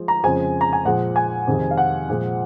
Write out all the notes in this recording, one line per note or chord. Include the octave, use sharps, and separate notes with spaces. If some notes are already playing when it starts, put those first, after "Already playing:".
Already playing: F3 G#3
A#5
F2 C#3 F3 G#3 G#5
A#5
G#5
A#2 F3 G#3 F#5
G#5
F2 C3 D#3 G#3
F5
F#5
A#2 F3 G#3